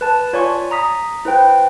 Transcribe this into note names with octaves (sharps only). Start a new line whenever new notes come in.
B4 A5
F4 C#5 D5 G#5 C#6
A#5 D#6 B6
E4 B4 C5 G5